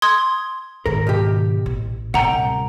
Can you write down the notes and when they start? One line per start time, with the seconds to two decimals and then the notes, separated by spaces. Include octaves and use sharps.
0.02 C6 D#6 G#6
0.86 G#2 D#3 A#4
1.07 B2 G4
1.66 A1
2.14 C2 C#3 F#5 G5 A#5
2.33 D1